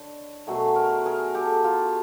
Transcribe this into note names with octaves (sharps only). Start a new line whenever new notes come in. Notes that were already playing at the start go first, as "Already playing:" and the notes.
Already playing: D3 C#5 D#5
B2 F#3 A3 G#4 A#4
A#4 C5
G#4 A#4 B4
G4 A4
F4 G4